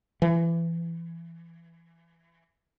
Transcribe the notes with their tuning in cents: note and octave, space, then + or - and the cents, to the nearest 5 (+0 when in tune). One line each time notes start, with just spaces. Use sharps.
E3 +25